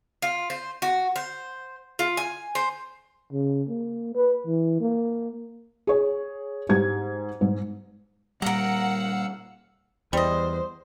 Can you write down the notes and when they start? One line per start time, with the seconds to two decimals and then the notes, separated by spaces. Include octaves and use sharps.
0.22 F4
0.50 C5
0.82 F#4
1.16 C5
1.99 F4
2.17 G#5
2.55 C5
3.33 C#3
3.69 A#3
4.15 B4
4.46 E3
4.81 A#3
5.87 G#4 C#5
6.69 G#2 G4 G#6
7.41 G#2
8.42 A#2 G3 A#4 F5 F#5 A#5 E6
10.13 E2 G3 C5 D#5